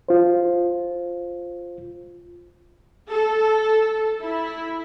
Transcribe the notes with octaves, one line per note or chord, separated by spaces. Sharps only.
F4 C5
A4
E4